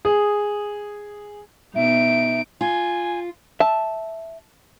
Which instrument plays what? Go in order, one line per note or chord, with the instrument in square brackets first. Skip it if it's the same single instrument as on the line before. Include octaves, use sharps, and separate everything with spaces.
[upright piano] G#4
[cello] B2 [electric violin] D#4 D7 [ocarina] E5
[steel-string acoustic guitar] F4 [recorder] G#5
[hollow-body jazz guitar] E5 [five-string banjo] A5